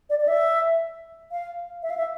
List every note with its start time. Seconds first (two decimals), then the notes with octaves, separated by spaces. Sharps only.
0.10 D5
0.20 D5
0.28 E5
1.32 F5
1.83 E5
1.90 F5
1.97 E5